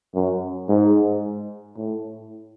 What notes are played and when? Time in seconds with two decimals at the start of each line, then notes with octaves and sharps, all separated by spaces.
0.15 F#2
0.69 G#2
1.77 A2